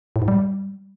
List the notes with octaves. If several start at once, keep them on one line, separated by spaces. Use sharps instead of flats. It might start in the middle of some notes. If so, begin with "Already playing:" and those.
A2
G#2
G3